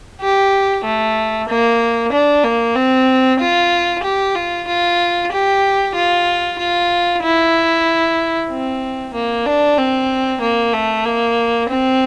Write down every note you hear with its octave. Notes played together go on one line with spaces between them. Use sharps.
G4
A3
A#3
D4
A#3
C4
F4
G4
F4
F4
G4
F4
F4
E4
C4
A#3
D4
C4
A#3
A3
A#3
C4